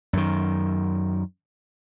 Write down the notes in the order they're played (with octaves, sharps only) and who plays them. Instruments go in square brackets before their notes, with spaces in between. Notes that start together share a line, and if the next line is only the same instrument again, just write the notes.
[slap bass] F#2 D#3